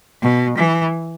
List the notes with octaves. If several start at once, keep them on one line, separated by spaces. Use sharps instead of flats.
B2
E3